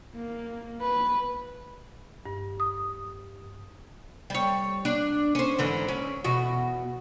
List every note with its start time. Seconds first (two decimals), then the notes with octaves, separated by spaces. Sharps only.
0.15 A#3
0.81 B4
2.26 G2
2.60 D#6
4.30 G3 C#5
4.85 D4
5.35 C#4 C5
5.59 G#2 D3 E3
5.88 C#4
6.24 E2 B2 F#4